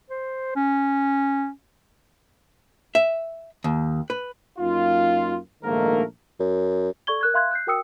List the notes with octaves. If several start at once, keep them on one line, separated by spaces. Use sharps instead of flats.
C5
C#4
E5
D#2
B4
F#2 A#3 D#4 F4
A#1 G#2 D#3 A3 A#3 A#4
F#2
A4 D5 C#6 G#6 G7
A#4 F#6 G#6
E5 F5 C6 F#6 G#6
F#6 G6 C7
F#4 A#4 G5 D#6 E6 C#7